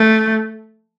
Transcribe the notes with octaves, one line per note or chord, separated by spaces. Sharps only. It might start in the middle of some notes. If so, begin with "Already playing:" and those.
Already playing: A3